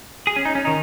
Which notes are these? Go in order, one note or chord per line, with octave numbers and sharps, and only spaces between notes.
G#4
C#4
D#4
C#4
D#3 D#4